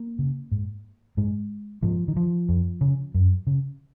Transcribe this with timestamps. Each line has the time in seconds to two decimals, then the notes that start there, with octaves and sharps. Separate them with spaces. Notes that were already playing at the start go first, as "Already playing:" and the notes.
Already playing: A#3
0.19 C#3
0.52 G#2
1.17 G#2 G#3
1.83 G#2 F3
2.08 D#3
2.16 F3
2.49 F2
2.81 C#3
3.14 F#2
3.47 C#3